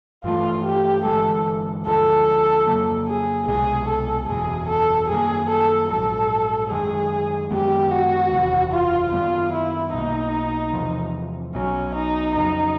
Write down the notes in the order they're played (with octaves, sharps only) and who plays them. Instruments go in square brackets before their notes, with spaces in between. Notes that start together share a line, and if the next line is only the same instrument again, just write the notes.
[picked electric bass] G2 E3 A3 [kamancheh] F4
[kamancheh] G4
[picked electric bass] G1 G2 E3 G#3 [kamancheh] A4
[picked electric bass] D2 D3 F3 G#3 [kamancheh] A4
[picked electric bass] F2 C#3 F#3 A#3
[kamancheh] G#4
[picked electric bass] C2 B2 G#3 [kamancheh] G#4
[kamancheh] A4
[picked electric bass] F#1 E2 B2 [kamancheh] G#4
[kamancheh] A4
[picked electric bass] F#2 D#3 G3 A#3 [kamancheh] G#4
[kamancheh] A4
[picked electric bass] A#1 G#2 D#3 F#3 [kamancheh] A4
[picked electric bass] F#2 D#3 G#3 [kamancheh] G#4
[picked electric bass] F#2 D#3 G#3 B3 [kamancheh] G4
[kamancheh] F#4
[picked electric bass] F#1 E2 C3 E3
[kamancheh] F4
[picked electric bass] F#2 D#3 G3 B3 [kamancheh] F4
[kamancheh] E4
[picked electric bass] B1 B2 G3 A#3 [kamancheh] D#4
[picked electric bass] E2 C3 F3
[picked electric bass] B1 B2 F#3 [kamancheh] C#4
[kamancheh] D#4
[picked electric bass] F2 C#3 F#3 [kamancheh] D#4